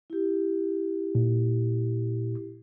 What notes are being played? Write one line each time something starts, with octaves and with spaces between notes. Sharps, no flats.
E4 G4
A#2